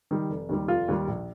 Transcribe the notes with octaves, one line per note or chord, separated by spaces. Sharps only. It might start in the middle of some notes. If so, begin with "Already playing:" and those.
D#3 G3
F1
D#2 D#3 G3
F1 F4
D#2 D#3 G3
A#1